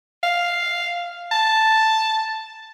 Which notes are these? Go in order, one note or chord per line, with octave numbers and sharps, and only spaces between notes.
F5
A5